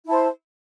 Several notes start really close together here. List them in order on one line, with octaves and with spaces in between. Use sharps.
E4 A5 C5